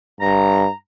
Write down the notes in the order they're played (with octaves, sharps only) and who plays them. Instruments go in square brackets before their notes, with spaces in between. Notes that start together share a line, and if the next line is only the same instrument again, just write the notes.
[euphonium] G2 [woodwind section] A#5